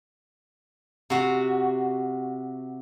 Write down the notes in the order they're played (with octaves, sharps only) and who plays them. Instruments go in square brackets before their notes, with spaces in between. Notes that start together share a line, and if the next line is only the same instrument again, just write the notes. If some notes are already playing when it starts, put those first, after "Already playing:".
[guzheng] C3 F#4